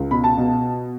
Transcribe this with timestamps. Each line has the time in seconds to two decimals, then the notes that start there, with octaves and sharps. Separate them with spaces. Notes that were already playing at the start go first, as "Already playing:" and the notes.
Already playing: C#2
0.11 B2 B5
0.24 A5
0.38 B2